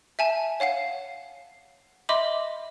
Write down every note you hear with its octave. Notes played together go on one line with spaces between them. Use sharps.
E5 G#5 A5
C#5 F5 F#5 C7
D#5 E5 B5 C6 D6